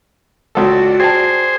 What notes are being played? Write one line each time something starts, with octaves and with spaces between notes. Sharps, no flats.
C#2 F#4 A4 D5
G#4 C5 G5 A5